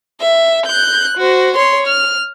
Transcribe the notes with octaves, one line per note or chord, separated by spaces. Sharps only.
E5
F#6 G6
F#4 C5
C#5 C6
F6